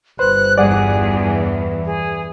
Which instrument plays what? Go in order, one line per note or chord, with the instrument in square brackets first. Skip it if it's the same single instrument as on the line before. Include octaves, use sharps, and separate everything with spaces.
[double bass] G1 [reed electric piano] B4 C5 [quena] F#6
[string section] E2 G2 [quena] G#4 [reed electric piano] D5 F#5
[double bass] E3
[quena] G#4